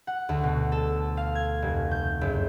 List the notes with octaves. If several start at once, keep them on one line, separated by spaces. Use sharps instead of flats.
F#5
D2
B2
A4
F5
G#6
F1
G6
F#1